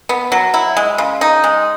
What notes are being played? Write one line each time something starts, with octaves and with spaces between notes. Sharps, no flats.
B3
F#3
E4
G#3
C#3
D#4
G#3